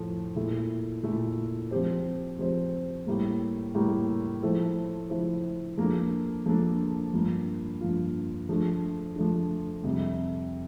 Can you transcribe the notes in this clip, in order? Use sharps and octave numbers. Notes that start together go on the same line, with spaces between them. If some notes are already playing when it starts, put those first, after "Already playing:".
Already playing: A2 F3 A3
A#2 A3 E4 A4
A#2 A3 E4 A4
F3 C4 G4 C5
F3 C4 G4 C5
A2 G3 A#3
A2 G3 A#3
F3 A3 E4 A4 C5
F3 A3 E4 A4 C5
F3 A#3 D4 A4
F3 A#3 D4 A4
G2 F3 A#3 F4
G2 F3 A#3 F4
F3 A3 D4
F3 A3 D4
F2 C3 G3